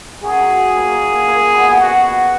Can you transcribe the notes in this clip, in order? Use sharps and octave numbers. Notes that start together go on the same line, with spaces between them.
F#2 F#3 G#4
A#2 A#3
A#2 A#3
B2 B3
F#4